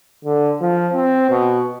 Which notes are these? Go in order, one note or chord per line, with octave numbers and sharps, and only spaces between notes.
D3
F3
C4
B2